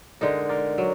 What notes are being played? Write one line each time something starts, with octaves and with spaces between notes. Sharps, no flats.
D3 G#3 D#4 A#4 D5
A#4 D5
F#3